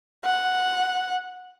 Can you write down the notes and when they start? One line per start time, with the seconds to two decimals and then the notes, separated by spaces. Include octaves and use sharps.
0.25 F#5